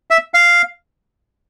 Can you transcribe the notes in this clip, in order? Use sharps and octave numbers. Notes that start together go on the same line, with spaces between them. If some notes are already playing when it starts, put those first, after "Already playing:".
E5
F5